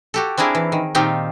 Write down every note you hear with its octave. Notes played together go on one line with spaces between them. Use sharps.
F#4 G4 A4
C4 D4 E4 G#4 A#4
E3
D#3
A#2 D#3 C4 D#4 F4 G4